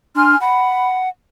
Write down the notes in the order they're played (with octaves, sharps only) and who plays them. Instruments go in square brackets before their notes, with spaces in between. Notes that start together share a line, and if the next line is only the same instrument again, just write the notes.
[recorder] D4 [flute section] G#5 C6 F6
[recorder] F#5 [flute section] B5